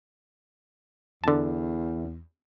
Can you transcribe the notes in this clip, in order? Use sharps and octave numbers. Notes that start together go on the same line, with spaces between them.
E2 D3 A5